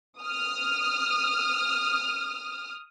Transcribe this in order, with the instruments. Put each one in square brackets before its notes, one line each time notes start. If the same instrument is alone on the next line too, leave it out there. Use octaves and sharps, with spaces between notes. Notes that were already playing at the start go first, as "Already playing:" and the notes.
[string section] D#6 F6